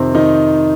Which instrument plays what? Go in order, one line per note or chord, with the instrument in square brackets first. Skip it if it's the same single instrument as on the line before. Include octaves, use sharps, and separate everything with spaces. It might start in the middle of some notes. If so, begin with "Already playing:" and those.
Already playing: [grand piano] F2 C3 D#3 C4
D#3 D#4